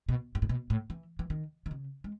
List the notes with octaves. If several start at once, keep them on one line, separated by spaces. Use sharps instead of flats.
B2
G#2
A2
B2
A2
E3
E3
D#3
D#3
C#3
G#3